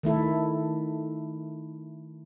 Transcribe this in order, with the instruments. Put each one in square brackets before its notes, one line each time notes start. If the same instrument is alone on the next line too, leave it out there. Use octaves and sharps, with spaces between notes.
[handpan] D#3 A3 E4 A4